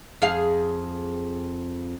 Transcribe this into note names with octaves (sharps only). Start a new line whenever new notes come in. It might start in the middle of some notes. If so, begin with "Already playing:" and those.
F2 G#4 F5